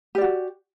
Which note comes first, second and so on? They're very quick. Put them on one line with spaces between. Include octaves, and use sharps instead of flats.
G4 D5 F#4